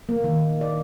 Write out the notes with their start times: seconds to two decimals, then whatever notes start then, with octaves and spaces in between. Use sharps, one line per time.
0.09 A#3
0.24 D#3
0.61 D5